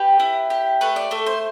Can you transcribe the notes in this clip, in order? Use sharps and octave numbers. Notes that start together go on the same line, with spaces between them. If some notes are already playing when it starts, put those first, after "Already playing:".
Already playing: G4 B4
E4
G4
A3 B4
D5
A3 A4
C5